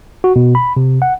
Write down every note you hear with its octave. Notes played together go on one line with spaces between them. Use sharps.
F#4
B2
B5
C3
F#5